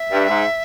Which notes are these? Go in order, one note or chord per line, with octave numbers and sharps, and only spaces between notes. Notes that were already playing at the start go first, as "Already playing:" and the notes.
Already playing: E5
G2
G#2